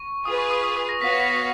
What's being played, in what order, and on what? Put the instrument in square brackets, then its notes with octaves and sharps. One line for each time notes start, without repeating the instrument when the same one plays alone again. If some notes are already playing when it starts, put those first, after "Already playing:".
Already playing: [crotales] C#6
[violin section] F4 G#4 B4 [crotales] D#6
[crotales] C#6
D#6
D#6
D#6
A#6
[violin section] B3 F#4 C#5 F5 [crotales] B6
[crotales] A#6
B6
A#6